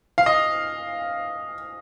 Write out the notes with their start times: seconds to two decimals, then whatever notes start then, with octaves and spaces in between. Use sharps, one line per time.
0.18 F5
0.26 D#5